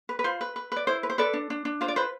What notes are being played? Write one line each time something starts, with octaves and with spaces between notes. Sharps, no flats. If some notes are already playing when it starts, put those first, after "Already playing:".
B4
B4
F4 C5
B4
B4
B4 D5
E4 C5
B4
C5
A4 B4 D5
D4
D4
D4
F4 C5
D5
B4 C5